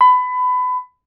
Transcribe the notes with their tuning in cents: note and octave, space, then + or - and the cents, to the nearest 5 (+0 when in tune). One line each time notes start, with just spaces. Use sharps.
B5 +25